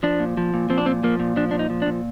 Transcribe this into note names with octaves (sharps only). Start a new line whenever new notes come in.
F3 D4
A#2
F3
A#2
F3 C4
D4
A#2 C4
F3 A#3
A#2
F3 D4
A#2 D4
D#4
F3
D4
A#2